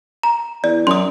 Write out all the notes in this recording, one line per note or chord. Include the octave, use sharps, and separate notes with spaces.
A#5
E2 D5
F#2 C6 D#6